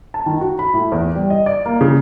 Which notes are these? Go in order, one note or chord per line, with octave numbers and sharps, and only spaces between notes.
A5
D#3
F#4
B5
A2
E2
G3
D#5
D5
A#3
C#3